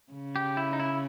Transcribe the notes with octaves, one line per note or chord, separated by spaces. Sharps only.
C#3
G4
E4
D#4
E4